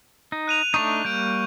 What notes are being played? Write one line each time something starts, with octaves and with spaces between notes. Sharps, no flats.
D#4
F#6 D#7 F7
A3 D4 D#4 C#6
G3 A#3 G6 D7